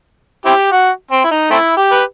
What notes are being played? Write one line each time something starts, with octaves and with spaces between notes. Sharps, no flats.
C4 E4 G4
F#4
C4
E4
D#4
A3 C4 E4
G4
B4